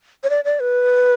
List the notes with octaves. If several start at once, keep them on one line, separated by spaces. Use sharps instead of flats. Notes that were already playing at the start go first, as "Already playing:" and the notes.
C#5
D5
D5
B4